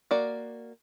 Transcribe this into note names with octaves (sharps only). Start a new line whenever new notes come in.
A#3 F#4 D5